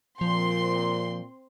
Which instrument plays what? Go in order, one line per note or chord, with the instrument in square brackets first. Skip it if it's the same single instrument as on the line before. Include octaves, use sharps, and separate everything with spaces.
[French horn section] A#2 [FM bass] F3 [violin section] C4 C6